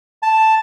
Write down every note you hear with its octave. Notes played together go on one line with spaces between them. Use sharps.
A5